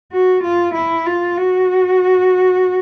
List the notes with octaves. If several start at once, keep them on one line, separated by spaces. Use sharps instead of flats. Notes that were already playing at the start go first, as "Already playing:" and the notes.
F#4
F4
E4
F4
F#4